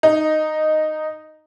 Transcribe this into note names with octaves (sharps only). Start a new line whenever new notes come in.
D#4